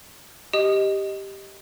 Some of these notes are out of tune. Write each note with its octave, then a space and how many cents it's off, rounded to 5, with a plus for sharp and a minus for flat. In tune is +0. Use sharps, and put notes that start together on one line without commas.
G4 +0 D#5 +0 D#6 -15